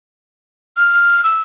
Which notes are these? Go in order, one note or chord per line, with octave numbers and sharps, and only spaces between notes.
F6
E6